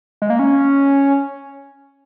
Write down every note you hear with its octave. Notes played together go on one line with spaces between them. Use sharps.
G#3
A#3
C#4